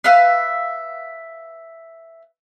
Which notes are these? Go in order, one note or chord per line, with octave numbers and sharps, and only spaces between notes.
B4 E5 F5 E6